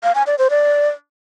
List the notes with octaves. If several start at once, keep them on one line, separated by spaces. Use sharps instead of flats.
F5
G#5
D5
C5
D5